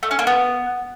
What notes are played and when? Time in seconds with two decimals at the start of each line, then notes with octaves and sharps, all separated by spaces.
0.03 A3
0.11 C#4
0.19 A#3
0.27 B3